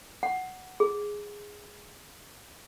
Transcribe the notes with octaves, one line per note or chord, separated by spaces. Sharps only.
F#5
G#4